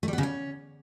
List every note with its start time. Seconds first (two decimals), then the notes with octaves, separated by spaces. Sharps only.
0.03 A3
0.08 G3
0.13 B3
0.18 C#3
0.23 C#4